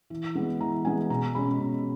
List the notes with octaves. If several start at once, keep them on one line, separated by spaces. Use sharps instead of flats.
E3
G#3 B3
E3 A#5
G#3 B3 G#5
B2 A#5
G#3 C#4 B5
B2